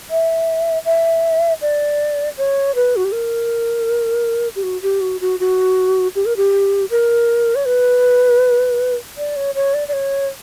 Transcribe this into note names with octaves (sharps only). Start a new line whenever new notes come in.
E5
E5
D5
C#5
B4
F#4
G4
A#4
G4
F#4
G4
F#4
F#4
F#4
G4
A#4
G4
A#4
C#5
B4
D5
C#5
C#5
D5
D5
C#5